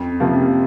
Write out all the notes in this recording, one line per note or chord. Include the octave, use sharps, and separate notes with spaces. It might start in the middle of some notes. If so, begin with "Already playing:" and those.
Already playing: F2
C3 F3 A#3